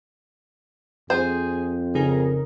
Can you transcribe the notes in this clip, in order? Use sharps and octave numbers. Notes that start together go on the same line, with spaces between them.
F2 G#4 C5
C#3 D#4 G#4 A#4